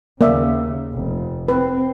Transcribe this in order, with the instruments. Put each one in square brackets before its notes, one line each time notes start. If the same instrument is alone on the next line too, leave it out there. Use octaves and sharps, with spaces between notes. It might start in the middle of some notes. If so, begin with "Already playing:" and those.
[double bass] D#2 C#3 [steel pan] A#3 D5 E5
[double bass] F1
[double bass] C4 [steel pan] B4